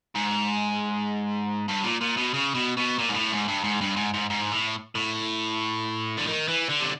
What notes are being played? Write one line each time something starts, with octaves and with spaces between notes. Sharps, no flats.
G#2
G2
A#2
A#2
B2
C#3
B2
B2
A#2
G#2
A2
G#2
G2
G#2
G2
G#2
G#2
G#2
A2
A2
D3
D#3
E3
D3
C3